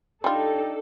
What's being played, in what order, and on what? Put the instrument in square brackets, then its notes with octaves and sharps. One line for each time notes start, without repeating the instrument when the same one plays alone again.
[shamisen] G3 F4 [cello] D4 D#4 [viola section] A4 [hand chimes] G5